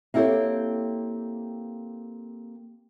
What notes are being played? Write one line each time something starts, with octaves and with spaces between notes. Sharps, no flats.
A#3 C4 E4 G4 A4 C#5